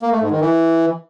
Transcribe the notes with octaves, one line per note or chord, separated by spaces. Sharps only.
A#3
A3
G#2
D#3
E3